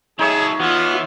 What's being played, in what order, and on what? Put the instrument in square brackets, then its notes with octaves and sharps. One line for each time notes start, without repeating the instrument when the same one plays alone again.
[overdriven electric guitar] F#3 A4 [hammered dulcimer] D#4 C#5 E5 [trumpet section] G#4
[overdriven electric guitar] E3 [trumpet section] B3 F#5 [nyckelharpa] F4